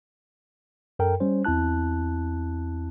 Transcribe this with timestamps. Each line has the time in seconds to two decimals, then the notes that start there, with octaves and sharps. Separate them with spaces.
0.99 F#2 A4 A#4 G5
1.20 G3 C#4 C5
1.45 E2 C4 E4 A5 F#6